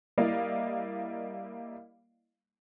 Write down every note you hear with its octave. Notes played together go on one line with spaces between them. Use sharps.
G3 A#3 E4 D5 D#5 F5